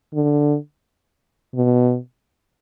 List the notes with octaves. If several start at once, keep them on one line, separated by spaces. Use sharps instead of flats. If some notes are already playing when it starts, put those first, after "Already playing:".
D3
B2